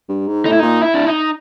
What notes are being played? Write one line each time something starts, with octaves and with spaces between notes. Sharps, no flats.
G2
G#2
A2 D#4
E4
A#2 D#4
E4
D4
D#4